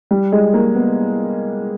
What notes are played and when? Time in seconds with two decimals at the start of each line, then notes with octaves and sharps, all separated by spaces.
0.11 G3
0.32 G#3
0.54 A#3
0.75 B3